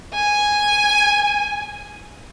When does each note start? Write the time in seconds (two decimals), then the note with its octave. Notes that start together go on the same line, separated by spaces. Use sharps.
0.15 G#5